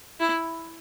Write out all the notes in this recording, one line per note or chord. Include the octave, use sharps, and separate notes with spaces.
E4